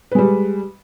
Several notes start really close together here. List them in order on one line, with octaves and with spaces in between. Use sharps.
B4 G#3 G3